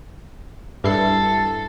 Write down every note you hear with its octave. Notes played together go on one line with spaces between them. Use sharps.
G2 E4 A4 C7